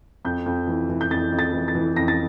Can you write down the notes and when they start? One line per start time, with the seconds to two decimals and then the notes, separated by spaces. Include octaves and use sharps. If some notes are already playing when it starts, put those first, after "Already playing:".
0.25 F2 G6
0.46 F2
0.67 E3
0.89 E3
1.01 G6
1.11 F2 A6
1.32 F2
1.39 A6
1.53 E3
1.68 A6
1.75 E3
1.96 F2 A#6
2.08 A6